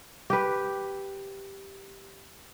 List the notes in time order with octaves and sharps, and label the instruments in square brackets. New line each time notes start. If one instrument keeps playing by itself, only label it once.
[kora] G4 B4